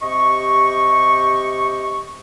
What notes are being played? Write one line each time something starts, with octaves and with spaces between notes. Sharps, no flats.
C3 G4 D#5 C#6